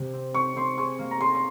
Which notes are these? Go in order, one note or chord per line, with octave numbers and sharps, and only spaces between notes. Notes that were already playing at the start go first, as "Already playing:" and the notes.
Already playing: C3
C4
C4 C#6
C4 C6
G#4 C#6
A#3
A#5
G#4 C6
C6